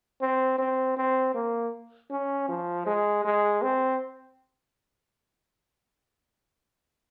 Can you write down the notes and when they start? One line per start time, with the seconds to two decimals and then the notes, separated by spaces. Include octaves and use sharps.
0.21 C4
0.58 C4
0.97 C4
1.34 A#3
2.10 C#4
2.48 F3
2.86 G#3
3.25 G#3
3.62 C4